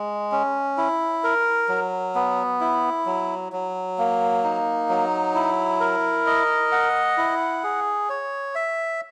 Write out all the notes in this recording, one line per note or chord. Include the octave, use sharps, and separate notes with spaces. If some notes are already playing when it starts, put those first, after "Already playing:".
Already playing: G#3
C#4
E4
A#4
F#3
B3
E4
F#3
F#3
A#3
D#4
F#3
E4
A#4
D#5
F#5
E4
G#4
C#5
E5